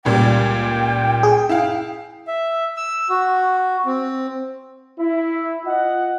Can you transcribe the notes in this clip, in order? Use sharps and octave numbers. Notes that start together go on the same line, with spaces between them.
C#2 A#2 G3 G5
G#4
E4 F5
E5
E6
F#4
C4
E4
F4 D#5 F#5